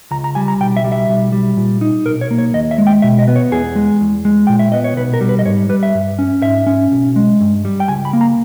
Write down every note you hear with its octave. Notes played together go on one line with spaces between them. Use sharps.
C#2 A#5
A#5
G3 G#5
A#5
B1 G5
E5
G3
E5
B1
G3
A#2
D#4
B1 A#4
C#5
A#3
C#5
D#2 D#5
E5
G#3
G5
B2 E5
D#5
B3
C#5
E2 G#4
G#3
E2
G#3
A#2 G5
E5
B3 D#5
C#5
B1 B4
A#4
G3
B4
D#5
G#2 C#5
G3 B4
E5
G2
C#4
G#2 E5
C#4
B1
G#3
G2
G3
G5
C#2 G#5
B5
A#3
A#5